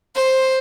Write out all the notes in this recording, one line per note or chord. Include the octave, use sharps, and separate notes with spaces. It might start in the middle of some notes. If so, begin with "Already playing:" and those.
C5